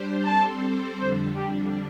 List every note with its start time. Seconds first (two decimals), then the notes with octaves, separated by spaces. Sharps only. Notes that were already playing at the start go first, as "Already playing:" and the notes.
Already playing: G3 D4 G4 C5
0.25 G3 C4 A4 C5 A5
0.99 F2 D3 G3 D4 C5
1.36 G4